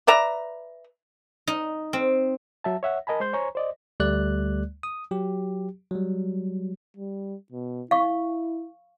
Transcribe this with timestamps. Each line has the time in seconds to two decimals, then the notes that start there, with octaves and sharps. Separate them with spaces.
0.07 B4 D5 E5 A#5
1.48 D#4
1.93 C4
2.64 F#3 E5 A5
2.83 C#5 E5 F#5
3.07 A#4 D#5 G#5 A5 B5
3.20 G#3 C5 C6 G6
3.33 C5 C#5 G#5 A#5 C#6
3.55 C5 D5 D#5
4.00 D2 G3 A3 D5 F#6
4.83 D#6
5.11 F#3 G4
5.91 F#3 G3
6.97 G3
7.52 B2
7.91 E4 F5 C#6